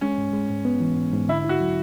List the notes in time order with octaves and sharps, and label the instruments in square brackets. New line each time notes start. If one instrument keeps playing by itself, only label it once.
[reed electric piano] G#3 [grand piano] C#4
[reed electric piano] G#2
G#3
G#2
B3
E3
G#2
G#2
[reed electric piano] D3 [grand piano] E4
[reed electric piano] E4 [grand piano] F#4
[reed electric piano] F#3